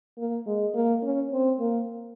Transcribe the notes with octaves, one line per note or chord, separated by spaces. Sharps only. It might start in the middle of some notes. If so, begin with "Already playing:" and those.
A#3
G#3
A#3
C#4
C4
A#3